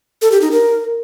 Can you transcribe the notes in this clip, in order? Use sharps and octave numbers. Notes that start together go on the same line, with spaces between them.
A4
G4
D#4
A#4